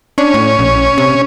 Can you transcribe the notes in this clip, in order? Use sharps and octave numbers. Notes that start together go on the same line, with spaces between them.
C#4 D4
A2
A#1
C3